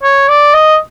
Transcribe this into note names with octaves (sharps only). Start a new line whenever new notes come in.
C#5
D5
D#5